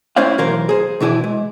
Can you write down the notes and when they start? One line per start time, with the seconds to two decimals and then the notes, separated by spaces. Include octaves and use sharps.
0.16 A3 C#4 E4 C5 D5 F5
0.38 B1 E3 A#4 C5 F5
0.69 G#4 C5
1.00 B2 E3 E4 D5 G#5
1.24 G#3